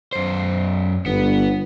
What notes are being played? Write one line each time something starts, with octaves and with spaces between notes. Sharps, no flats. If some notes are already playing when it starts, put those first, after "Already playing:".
F#2 C5
G1 B3